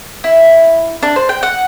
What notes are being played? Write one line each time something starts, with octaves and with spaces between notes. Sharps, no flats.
E4
D4
C5
G5
F#5